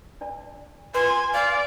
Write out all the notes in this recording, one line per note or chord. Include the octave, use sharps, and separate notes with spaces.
D4 D5 A5
F4 B4 G#5 C6
D5 F5 G#5